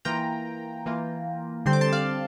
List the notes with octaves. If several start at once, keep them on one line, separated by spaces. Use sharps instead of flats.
E3 A#3 F4 G5 A#5
E3 A#3 F4
D3 G3 C4 C6
D6
A5 C6
D5 F5